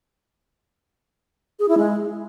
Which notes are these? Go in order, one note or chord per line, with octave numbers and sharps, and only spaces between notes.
G#4
E4
G#3